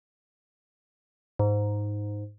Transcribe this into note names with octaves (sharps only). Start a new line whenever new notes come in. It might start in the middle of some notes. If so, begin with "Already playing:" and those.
G#2